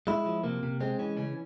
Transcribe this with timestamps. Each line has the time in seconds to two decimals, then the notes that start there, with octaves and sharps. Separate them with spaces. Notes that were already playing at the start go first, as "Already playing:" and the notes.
0.07 G#3 E4
0.26 F3
0.44 C3 A#3
0.63 C3
0.81 G#3 C4
0.99 E3 C#4
1.17 C#3 C#4